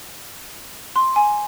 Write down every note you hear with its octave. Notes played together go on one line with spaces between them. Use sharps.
C6
G#5